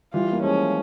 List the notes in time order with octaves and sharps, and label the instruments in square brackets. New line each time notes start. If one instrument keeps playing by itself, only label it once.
[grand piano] E3 G3 [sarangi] F4
[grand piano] A#3
[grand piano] F3 G#3 [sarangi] C#4